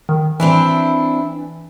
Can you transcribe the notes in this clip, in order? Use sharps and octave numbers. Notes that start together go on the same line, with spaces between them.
D#3
E3 C4 D4 E4